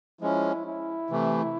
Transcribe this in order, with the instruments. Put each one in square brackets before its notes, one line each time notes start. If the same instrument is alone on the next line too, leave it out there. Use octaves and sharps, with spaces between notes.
[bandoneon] F3 G#3 C#4 [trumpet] E4
[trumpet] E4
[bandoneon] C3 E3 A3